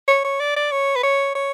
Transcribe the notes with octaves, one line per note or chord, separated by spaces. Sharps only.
C#5
C#5
D5
D5
C#5
B4
C#5
C#5